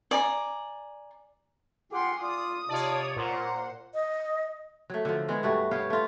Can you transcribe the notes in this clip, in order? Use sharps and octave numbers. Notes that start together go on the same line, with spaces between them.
D5 G#5 A#5
F4 G#4 F#5 G5 C6 D6
F4 D5 D6 D#6
C3 D#4 F4 C#5 D5 A5
A#2 F4 C5 F#5 A#5
D#5
F#3 A3
D3 F3
E3 G#3 B3
G2 A3 F#4
B3 C#5 F5 G5
A3 F4